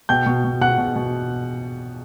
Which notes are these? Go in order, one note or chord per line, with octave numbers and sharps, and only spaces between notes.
B2 G5 G6
B2
B2
B2 F#5 F#6
B2
B2